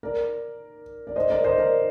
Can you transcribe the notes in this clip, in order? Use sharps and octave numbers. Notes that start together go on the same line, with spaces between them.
A#4 D5
D5
C5 D#5
A#4 D5
C5 D#5
A#4 D5